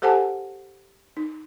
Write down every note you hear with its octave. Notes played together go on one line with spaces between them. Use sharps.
G4 A4 C5 F#5 G#5 A5
D#4